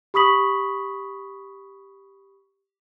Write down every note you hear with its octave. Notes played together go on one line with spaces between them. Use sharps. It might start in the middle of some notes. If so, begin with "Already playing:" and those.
G4 B5 C#6 D#6 B6 F#7